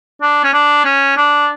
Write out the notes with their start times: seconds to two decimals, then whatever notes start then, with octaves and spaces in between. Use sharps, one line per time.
0.22 D4
0.44 C#4
0.53 D4
0.85 C#4
1.17 D4